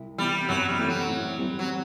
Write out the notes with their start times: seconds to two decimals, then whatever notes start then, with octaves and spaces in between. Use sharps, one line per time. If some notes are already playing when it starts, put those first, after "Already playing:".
Already playing: C2
0.18 C3 E3 G3 B3 E4
0.49 F#2 F#3
0.69 G3
0.78 E3 A3 C4
0.89 F#3
1.09 A2
1.38 E3 G3 C4
1.59 F#3